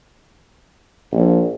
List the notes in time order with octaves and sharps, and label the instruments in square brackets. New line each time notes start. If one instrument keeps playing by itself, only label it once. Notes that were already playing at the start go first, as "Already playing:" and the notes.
[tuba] A#1